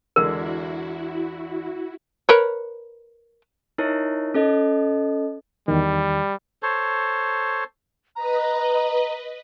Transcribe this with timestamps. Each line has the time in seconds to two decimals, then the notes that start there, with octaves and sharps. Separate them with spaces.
0.16 E2 D3 G#3 E4 F#4 A#4
2.29 A#4 B4 C#5
3.78 D#4 E4 A#4 C#5
4.34 C#4 A4 D#5
5.68 E2 D#3 G3
6.63 A4 C5 C#5
8.16 B4 D#5 A#5